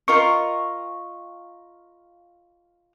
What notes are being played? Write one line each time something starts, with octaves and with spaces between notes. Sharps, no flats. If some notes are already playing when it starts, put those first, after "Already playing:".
F4 A#4 D#5 C#6